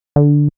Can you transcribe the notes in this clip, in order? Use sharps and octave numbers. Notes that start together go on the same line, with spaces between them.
D3